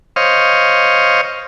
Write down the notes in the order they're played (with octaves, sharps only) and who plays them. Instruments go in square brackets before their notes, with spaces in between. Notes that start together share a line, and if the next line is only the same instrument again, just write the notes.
[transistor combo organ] C5 C#5 D#5 F5